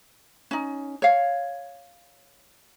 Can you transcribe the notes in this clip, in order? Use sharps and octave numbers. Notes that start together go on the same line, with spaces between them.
C#4 D#4
C#5 F5